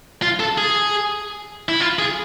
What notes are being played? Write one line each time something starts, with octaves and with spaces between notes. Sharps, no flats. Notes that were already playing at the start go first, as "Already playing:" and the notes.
F4
A4
G#4
E4
F4
G#4